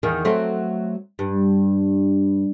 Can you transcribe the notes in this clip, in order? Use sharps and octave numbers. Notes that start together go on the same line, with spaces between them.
E2 D#3
F#3 A3 C4
G2